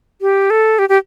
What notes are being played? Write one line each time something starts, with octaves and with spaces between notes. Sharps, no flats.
G4
A4
G4
G4